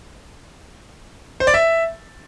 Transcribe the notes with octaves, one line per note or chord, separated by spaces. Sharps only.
C5
D5
E5